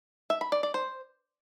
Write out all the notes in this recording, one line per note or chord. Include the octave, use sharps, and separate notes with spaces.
E5
B5
D5
D5
C5